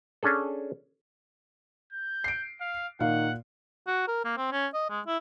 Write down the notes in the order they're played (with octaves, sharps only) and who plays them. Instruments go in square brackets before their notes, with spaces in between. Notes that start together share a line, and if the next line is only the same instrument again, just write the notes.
[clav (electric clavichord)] C#4 D4 G#4 A4
[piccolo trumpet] G6
[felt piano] C7 D7
[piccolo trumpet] F5
[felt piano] A#2 F5 [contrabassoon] D#3 [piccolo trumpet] F#5
[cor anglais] F#4
A#4
A#3
C4
C#4
D#5
G#3
E4